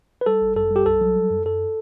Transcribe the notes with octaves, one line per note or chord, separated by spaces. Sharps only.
B4
G3 A4
G1
F#2 A4
G3
G4
B1 A4
F#3
G3
F#2
F#2 A4